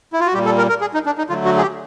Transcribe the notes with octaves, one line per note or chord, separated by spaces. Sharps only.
E4
F4
F#4
A#2 G3 G4
A4
A#4
A#4
G#4
D#4
D4
D#4
D3 F#3 A3 F4
F#4
G#4
G4